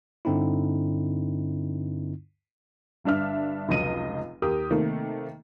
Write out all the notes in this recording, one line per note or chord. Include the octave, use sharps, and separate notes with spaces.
G2 D3 C4 D#4 E4
G1 G2 D4 E5 F6
F1 C#2 F#3 D#5 D#7
D#2 G4 A#4 D#6
C3 D#3 A3 A#3